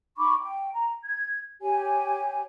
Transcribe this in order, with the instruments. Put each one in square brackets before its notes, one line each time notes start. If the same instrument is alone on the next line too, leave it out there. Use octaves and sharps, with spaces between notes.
[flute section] D#4 B5 C#6 D6
G5
A#5
G#6
G4 C#5 G#5